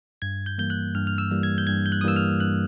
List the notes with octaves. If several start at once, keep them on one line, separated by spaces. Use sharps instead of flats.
G2 G#6
G6
E3 G3 A#3 G6
F#6
G2 F6
F6
E6
E3 G3 A#3
G#6
G6
G2 G#6
G6
F#6
D#6
E3 G3 A#3 E6
F6
G2 F#6